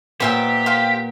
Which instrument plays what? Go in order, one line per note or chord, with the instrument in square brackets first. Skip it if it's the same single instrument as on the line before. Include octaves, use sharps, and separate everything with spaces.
[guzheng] A#2 B3 [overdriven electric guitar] G4 [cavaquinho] C5 E5 G5
[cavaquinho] C5 F5 G5